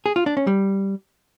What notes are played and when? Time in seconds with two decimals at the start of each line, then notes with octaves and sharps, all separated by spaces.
0.06 G#4
0.16 F4
0.26 D4
0.37 C#4
0.47 G3